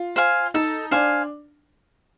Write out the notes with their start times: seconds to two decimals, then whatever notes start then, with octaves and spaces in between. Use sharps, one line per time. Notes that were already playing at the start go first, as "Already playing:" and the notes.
Already playing: F4
0.16 C5 F5 G#5
0.54 D#4 A4
0.91 D4 C5 F5 G#5